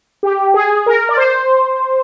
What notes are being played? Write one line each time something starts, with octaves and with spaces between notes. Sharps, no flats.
G4
G#4
A#4
D5
C5